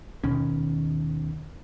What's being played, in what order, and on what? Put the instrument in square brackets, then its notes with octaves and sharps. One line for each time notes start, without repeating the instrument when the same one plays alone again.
[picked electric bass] D#2 B2 D#3 C#4